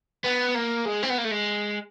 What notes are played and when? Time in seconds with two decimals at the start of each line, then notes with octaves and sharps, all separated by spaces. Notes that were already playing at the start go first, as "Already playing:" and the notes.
0.24 B3
0.55 A#3
0.86 G#3
1.03 C4
1.10 B3
1.18 A#3
1.24 A3
1.31 G#3